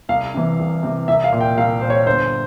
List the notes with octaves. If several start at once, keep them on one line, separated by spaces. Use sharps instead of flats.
C2 F5
C3 E3
C2
C3 E3
C2 E5
F5
A#2
G5
C2 F5
A#2 C5
C#5
G1 C5